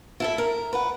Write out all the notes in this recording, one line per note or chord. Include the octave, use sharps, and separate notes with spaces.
E4 A4 E5
A#4
B4 F#5